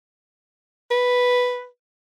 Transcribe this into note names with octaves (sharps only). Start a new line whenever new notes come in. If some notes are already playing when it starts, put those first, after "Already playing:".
B4